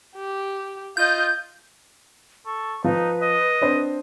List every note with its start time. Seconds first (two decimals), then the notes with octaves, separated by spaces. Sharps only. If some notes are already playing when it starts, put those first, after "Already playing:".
0.16 G4
0.97 F4 D#5 G6
2.46 A4 C#6
2.84 F3 D#4 B4
3.22 D#5
3.61 C4 D4 C5